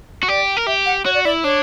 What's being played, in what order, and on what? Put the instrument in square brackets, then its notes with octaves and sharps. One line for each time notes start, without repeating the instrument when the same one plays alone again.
[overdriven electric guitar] F#4
[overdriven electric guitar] G4 [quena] D5
[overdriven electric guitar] A#4
[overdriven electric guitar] G4 [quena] E5
[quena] F#5
[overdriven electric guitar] F#4 [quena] C#5
[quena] D5
[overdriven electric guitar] E4 [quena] D5
[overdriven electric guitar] D4 [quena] C#5